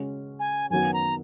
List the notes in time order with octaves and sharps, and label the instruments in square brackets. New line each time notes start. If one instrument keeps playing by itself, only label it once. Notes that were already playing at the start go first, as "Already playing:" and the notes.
Already playing: [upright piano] C#3 G#3 C#4 F#4
[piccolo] G#5
[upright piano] F#2 D#3 F#3 B3 [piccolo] G#5
[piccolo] A#5